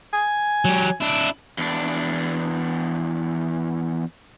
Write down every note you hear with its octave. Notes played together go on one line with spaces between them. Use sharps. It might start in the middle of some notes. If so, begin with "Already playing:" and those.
G#5
F#3 G4
D4 E4
E2 D4